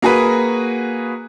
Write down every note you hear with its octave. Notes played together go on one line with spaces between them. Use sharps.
A#3 F#4 G#4 B4